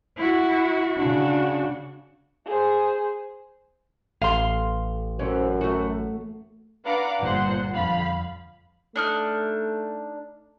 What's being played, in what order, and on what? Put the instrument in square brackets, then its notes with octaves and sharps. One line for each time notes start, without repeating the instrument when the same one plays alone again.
[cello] E4 F#4
[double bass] C#3 D4 [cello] F#4
[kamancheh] G#4 C5
[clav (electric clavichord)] A1 [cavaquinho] F5 C6
[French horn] F#2 [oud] E3 C4 C#4
[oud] A3 F#4
[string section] D4 B4 F5 F#5 A#5 D6
G1 G2 A#2 C5 F#5 C6
F2 D3 F5 B5
[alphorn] A3 [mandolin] D4 D#4 F6